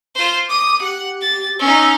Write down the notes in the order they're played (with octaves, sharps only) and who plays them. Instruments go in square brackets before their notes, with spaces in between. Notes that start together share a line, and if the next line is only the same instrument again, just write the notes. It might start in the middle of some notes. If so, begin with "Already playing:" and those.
[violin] F4 C5
[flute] D6 [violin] D#6
[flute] G4 [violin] F#5
[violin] A6
[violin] C#4 D#4 [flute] E6